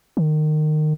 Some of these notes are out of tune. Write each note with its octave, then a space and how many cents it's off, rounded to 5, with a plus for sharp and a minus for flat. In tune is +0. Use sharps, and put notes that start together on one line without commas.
D#3 -25